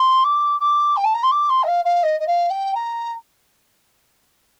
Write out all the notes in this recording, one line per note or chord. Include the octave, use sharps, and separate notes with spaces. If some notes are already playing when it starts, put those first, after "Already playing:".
Already playing: C6
D6
D6
G5
A5
A#5
C6
D6
C6
D#5
F5
F5
D#5
D#5
F5
G5
A#5